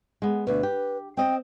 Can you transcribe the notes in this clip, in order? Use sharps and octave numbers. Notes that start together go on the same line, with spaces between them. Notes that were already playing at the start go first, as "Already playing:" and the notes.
G#3 B3
D2 B2 B4
G4
C4 D#5 G5